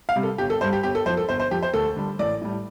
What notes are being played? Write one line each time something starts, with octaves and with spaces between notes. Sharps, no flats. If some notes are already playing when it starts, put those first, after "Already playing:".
F5
C3 G3
A4
G1 G4
A4
G2 G3 C5
G4
G1 G4
A4
F2 F3 C5
A4
G1 C5
C5
F2 F3 G4
C5
D2 A4
D3 G3
A1 D5
A2 G3